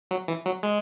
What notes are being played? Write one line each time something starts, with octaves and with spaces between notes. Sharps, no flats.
F#3
E3
F#3
G#3